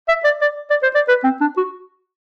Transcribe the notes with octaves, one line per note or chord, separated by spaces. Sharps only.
E5
D5
D5
D5
C5
D5
B4
C4
D4
F#4